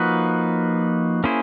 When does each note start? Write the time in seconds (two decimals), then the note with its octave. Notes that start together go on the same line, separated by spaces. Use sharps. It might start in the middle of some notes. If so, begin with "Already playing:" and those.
Already playing: F3 A#3 D#4 F#4 B4
1.24 A#3 C#4 E4 G#4 C5